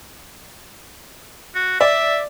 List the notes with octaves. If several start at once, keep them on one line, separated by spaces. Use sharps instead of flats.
F#4
D5 E5